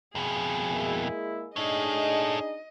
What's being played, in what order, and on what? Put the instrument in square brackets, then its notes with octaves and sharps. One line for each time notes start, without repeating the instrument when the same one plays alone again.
[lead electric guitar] F2 B2 [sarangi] G#4
[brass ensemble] G#3 A#3 E4
[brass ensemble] D4 D#4 G#4 [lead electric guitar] A4 C#5 [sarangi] D#5